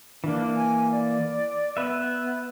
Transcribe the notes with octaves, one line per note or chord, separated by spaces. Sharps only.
E3 A#3 D4
G#5
D5
B3 B4 E5